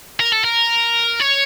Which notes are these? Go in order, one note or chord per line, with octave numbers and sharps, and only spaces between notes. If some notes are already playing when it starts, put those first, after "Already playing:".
A#4
A4
A#4
C#5